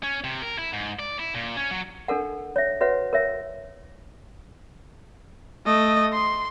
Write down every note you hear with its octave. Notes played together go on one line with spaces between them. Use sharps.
C#4
C3
A#4
E4
G#2
D5
E4
A#2
C#4
F#3
D4 A4 A#4 F#5
C#5 E5
F#4 B4 C#5 E5 F#5
A#4 C#5 E5
A3 D#5
C6